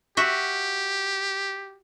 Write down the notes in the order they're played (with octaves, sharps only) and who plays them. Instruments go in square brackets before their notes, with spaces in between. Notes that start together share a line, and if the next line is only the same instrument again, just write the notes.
[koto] F#4 E5 [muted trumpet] G4